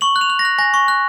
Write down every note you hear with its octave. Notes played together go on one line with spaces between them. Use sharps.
C#6 F#7
F#6
F7
F#6
A#6
F#6
G#5 A#6
C#6
F#6